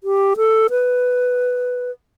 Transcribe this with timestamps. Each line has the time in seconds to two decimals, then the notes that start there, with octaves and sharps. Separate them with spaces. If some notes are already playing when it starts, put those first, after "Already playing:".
0.04 G4
0.37 A4
0.70 B4